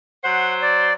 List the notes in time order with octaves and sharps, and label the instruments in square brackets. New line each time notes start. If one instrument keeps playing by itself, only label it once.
[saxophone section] F#3 C5 [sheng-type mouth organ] F#5
[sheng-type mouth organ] D5